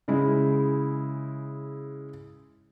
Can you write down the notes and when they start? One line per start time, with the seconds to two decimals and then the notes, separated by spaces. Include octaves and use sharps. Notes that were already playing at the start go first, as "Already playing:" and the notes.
0.08 C#3 G#3 E4